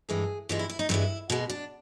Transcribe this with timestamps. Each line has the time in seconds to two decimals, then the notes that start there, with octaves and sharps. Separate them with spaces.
0.09 G2 E3 G#3 G#4
0.49 G2 E3 G#3 F4
0.59 E4
0.69 E4
0.79 D#4
0.89 G2 E3 G#3 E4
1.30 B2 G#3
1.50 D4